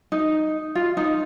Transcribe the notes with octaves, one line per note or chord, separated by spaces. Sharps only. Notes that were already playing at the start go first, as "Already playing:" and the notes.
D#4
F4
D#4